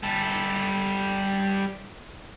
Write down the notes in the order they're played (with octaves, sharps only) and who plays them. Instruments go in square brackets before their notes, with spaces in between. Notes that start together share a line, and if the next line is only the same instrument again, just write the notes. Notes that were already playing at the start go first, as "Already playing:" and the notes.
[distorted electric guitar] G3 A4